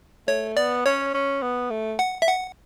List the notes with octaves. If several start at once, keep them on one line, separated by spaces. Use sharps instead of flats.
A3 C#5
B3 D5
C#4 C#5
C#4
B3
A3
F#5
E5
F#5